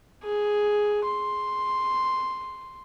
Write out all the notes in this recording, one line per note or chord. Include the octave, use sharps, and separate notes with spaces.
G#4
C6